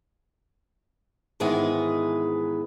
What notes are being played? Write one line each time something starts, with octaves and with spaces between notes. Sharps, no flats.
G#2 D#3 E3 G#3 B3 G#4